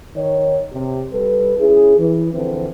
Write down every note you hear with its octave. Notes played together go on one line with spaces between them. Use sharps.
D#3 C#5
C3 G4
G3 A4 B4
C#4 E4 G#4
E3
D3 E3 F3 C4